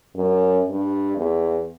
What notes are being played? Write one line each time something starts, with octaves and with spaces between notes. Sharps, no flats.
F#2
G2
E2